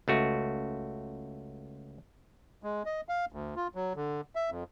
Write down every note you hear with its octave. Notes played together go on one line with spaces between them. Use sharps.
C#2 A3 F#4
G#3
D#5
F5
D2
F4
F#3
D3
E5
F2